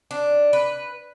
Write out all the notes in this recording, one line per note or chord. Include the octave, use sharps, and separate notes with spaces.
D4
B4